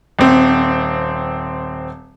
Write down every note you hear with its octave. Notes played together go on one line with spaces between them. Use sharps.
D#1 C4